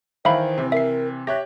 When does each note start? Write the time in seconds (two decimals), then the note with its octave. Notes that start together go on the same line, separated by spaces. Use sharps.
0.25 D#3 E3 C5 E5 F5 B5
0.58 C3 E3
0.72 A#4 E5 C7
1.27 G4 C#5 E5 F#6 A#6